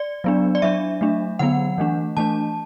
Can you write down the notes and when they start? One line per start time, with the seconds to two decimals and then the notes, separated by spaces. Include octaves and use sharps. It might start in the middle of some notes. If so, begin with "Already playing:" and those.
Already playing: D5
0.24 F#3 B3 D4
0.55 D5
0.62 F#3 D4 E5
1.01 F#3 A3 D4
1.39 D3 F#3 B3 F#5
1.78 E3 A3 D4
2.17 E3 A3 D4 A5